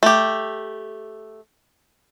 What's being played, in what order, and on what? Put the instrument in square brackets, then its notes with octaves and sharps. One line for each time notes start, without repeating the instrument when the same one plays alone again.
[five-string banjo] A3 G4